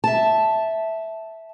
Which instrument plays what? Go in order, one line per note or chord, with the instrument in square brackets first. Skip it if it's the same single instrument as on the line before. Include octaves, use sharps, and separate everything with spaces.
[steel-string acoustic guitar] E5 A5